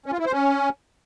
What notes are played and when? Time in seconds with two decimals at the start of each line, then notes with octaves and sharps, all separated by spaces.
0.06 C#4
0.13 F4
0.19 E4
0.26 C5
0.32 C#4